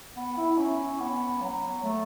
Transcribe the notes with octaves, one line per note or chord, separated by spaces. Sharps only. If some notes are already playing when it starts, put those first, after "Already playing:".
B3
E4
C#4
B3
F#3
A3